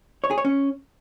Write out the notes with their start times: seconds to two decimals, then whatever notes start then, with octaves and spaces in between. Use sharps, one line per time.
0.24 C#5
0.31 G#4
0.38 C#5
0.45 C#4